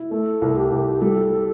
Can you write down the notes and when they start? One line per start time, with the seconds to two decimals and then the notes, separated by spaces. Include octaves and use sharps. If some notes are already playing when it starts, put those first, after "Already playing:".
Already playing: E4
0.11 A3 A4
0.42 C2
0.57 G4
0.72 C2
1.01 G3 A4